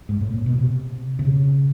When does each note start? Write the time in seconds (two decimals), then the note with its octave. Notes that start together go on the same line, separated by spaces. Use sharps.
0.09 G#2
0.21 A2
0.34 A#2
0.46 B2
0.58 C3
1.19 C3
1.25 C#3